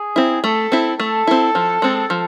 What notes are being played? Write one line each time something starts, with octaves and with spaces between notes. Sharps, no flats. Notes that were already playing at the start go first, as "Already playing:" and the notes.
Already playing: G#4
C4 E4
A3 A4
C4 E4
A3 A4
C4 E4
F3
G#3 C4
F3